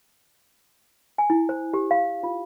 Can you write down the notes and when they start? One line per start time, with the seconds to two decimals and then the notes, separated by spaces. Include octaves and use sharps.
1.18 G#5
1.30 E4
1.49 C5
1.73 G4
1.91 F5
2.23 F4